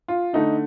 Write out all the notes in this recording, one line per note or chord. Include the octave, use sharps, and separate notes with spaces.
F4
D3 A3 D#4